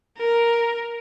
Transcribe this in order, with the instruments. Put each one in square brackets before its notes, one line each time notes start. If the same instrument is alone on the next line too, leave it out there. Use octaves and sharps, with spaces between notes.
[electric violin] A#4